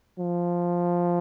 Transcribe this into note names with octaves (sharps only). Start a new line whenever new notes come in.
F3